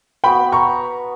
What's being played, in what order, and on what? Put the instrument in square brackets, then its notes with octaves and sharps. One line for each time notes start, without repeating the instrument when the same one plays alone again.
[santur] B3 F#4 B4 [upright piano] G5 B5
[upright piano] A#5 C#6